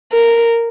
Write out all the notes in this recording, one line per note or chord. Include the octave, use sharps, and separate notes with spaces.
A#4